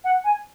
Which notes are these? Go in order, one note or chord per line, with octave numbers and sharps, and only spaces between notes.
F#5
G#5